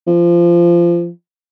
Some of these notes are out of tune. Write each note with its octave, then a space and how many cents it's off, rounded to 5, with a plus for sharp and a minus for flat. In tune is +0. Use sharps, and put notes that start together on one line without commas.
F3 -20